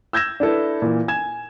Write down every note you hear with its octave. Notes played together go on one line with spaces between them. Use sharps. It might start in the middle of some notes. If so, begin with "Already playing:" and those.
E6 G6 G#6 A#6 E7
D4 E4 A4 B4
A#2 E3
G#5 G#6 E7